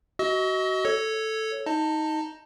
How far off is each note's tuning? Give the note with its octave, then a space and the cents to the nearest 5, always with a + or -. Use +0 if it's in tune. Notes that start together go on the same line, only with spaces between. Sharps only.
F#4 +25 D#5 +25 E6 -30
A4 +0 C#5 +0
D#4 +15 D#5 +0 A5 +25